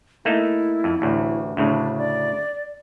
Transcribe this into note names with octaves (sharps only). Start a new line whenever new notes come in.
A3 A#3 D#4 E4
F2
A1 D2
D2 A2 C#3 D4
D5